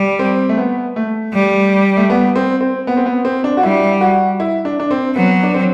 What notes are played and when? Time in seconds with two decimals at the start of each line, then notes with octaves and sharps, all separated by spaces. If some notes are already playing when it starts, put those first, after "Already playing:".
Already playing: G3
0.19 C4
0.49 A3
0.57 B3
0.96 A3
1.34 G3
1.97 A3
2.10 B3
2.36 C4
2.61 C4
2.87 B3
2.97 C4
3.06 B3
3.25 C4
3.44 D4
3.57 F#4
3.63 G3 E4
4.01 F#4
4.40 E4
4.65 D4
4.80 D4
4.91 C4
5.15 F#3 B3
5.43 D4
5.54 C4